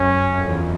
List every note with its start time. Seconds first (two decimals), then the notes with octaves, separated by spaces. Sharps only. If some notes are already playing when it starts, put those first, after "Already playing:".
Already playing: F#2 C#4
0.38 F2
0.48 E2